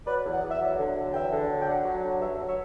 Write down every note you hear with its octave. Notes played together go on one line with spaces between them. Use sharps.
F#3 B4 D5
E2
D5 F#5
E2
E5
F#3 D5 F#5
D3
F#3
E2 E5 G5
D3
F#3
G5
D3 D5 F#5
F#3
D3
G2 C#5 E5
F#3
C#5 E5